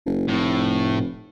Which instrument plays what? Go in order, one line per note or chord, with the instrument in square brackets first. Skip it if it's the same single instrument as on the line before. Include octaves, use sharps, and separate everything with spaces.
[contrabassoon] F#1
[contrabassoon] F1 [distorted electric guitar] A2